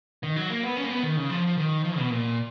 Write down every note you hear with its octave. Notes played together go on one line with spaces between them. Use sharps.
D#3
F#3
A#3
B3
C#4
A#3
B3
D#3
C#3
F3
F3
D#3
F3
B2
A#2